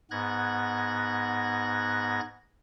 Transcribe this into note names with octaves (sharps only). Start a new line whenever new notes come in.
G#2 B3 F#6 G#6 A#6